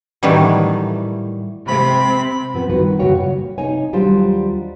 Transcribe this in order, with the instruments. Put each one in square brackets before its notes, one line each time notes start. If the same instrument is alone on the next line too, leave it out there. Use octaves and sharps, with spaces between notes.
[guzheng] A2 D#3 E3 F#3 G3
[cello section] C3 C4 [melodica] B5
[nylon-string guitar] F3 B3 C4
G2 D#3 F#4 B4
F#2 A#2 C#3 F#4 C#5 G5
C#5
C3 D#4 C#5 G#5
D#2 F#3 G3 D4 F4 C5